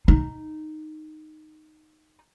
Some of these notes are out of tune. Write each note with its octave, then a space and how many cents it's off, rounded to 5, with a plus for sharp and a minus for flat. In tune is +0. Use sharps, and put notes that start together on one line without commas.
D#4 -10